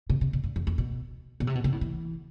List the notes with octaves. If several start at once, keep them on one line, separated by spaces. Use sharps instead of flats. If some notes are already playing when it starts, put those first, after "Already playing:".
C3
C3
B2
G2
F2
F2
B2
B2
C3
B2
C3
A2
E3